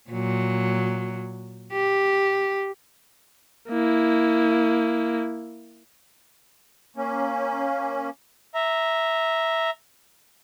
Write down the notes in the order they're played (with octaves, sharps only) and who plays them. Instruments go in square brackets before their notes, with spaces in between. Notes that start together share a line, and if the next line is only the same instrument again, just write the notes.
[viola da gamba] A#2 F#3
G4
[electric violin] A#3 E4
[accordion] A#3 C#4
[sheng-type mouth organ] E5 A#5